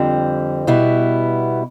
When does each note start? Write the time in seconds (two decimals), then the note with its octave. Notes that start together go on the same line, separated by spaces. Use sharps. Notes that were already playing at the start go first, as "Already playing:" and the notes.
Already playing: F2 D3 G3 C4
0.67 B2 G3 B3 E4